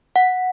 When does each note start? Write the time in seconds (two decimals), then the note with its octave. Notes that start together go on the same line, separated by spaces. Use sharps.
0.16 F#5